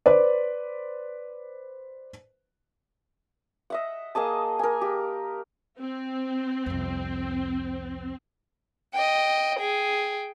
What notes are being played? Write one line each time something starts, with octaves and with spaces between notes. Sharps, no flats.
B4 C5 D5
D#5 E5 F#5
A#3 G#4 D#5 A5
A#4 G#5
G4
C4
C2 F2
D#5 G5
G#4 G5